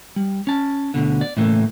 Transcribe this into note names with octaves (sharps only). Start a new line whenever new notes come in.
G3
C#4 A5
D2 G#2 B2 D3
D5
A2 C#3 E3 A3 A#3